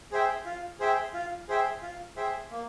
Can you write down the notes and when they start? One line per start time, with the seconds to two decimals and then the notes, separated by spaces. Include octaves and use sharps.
0.12 G#4 C5 E5 G5
0.45 F4
0.79 G#4 C5 E5 G5
1.14 F4
1.48 G#4 C5 E5 G5
1.82 F4
2.16 G#4 C5 E5 G5
2.51 A#3